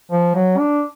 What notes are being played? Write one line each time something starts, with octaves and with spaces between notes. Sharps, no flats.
F3
F#3
D4